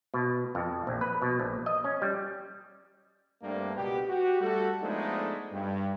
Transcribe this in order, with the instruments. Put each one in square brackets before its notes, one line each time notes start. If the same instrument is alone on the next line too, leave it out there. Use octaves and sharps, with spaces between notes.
[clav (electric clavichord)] B2
F2
A#1
B4
B2
A#1
D#5
C#4
G3
[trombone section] G2 A3 A#3 C4 D4
C#2 B2 B3 G4
F#4 G4
G3 A3 F#4 A4
F3 G#3 A3 B3 D4 D#4
G2